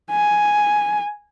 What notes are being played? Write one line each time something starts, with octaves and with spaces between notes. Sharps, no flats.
G#5